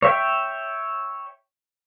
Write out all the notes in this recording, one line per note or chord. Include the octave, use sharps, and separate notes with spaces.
C#5 E5 G5